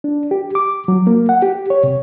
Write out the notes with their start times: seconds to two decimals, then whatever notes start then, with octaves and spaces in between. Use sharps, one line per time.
0.04 D4
0.31 G4
0.55 D6
0.88 F#3
1.07 A#3
1.29 F#5
1.42 G4
1.70 C#5
1.84 C3